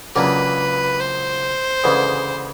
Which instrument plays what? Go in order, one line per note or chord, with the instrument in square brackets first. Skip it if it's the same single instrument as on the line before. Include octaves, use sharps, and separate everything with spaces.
[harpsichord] C#2 C#3 F#3 A#3 D4 [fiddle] B4
[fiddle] C5
[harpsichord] D2 C#3 E3 G#3 B3